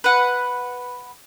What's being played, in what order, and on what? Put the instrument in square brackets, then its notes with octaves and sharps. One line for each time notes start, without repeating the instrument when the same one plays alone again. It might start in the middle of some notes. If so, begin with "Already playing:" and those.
[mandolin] B4 F#5